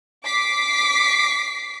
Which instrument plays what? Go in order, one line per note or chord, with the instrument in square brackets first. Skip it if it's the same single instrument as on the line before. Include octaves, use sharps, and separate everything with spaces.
[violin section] D6 B6 C7